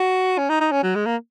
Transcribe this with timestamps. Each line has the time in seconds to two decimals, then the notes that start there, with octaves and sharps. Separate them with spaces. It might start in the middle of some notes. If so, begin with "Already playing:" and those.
Already playing: F#4
0.38 C#4
0.50 D#4
0.61 D#4
0.72 C#4
0.83 F#3
0.95 G#3
1.06 A#3